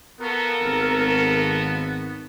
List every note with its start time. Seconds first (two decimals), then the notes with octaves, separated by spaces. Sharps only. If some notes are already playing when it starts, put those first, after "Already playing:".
0.20 B3 F4 F#4 A4 A#4
0.61 G#1 B3